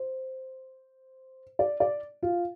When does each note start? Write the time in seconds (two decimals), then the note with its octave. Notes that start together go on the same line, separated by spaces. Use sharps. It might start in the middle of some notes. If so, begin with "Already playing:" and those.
Already playing: C5
1.59 D5
1.80 D5
2.23 F4